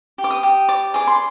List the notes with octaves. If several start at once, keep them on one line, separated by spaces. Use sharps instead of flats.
G4
D6
D#6
G4
D5 D6
G#4 D6
C6